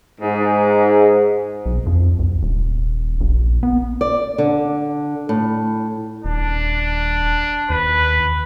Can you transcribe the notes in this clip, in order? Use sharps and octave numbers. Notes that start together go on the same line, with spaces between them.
G#2
B1
F2
C2
D#1
A#1
B3
D5
D3
A2
D#1 D4
D#2 B4